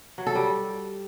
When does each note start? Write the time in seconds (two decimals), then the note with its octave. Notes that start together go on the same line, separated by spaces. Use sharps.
0.18 F#3
0.27 A4
0.35 G3